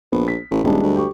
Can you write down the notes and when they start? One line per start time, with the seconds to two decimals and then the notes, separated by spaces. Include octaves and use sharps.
0.12 A#1 B3
0.28 B6
0.51 A1
0.64 D#1 G3 G#3 D4
0.83 D2
0.96 G4 C#6